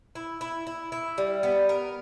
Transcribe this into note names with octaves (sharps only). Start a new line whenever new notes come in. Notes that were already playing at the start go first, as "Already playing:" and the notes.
E4
E4
E4
E4
G3
B3
A#4